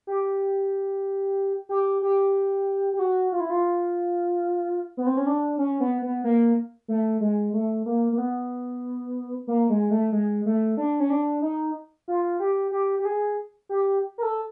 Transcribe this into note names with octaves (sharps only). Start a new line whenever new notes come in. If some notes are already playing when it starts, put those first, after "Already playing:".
G4
G4
G4
G4
F#4
F4
E4
F4
B3
C4
C#4
D4
C#4
B3
B3
A#3
A3
G#3
A3
A#3
A#3
B3
A#3
G#3
A3
G#3
A3
D4
C#4
D4
D#4
F4
G4
G4
G4
G#4
G4
A#4
A4